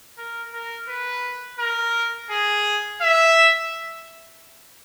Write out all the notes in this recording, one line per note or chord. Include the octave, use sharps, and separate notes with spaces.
A#4
A#4
B4
A#4
G#4
E5